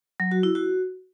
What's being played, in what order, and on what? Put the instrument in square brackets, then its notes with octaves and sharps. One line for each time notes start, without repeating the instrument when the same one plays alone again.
[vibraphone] F#3
F#4
E4
F#4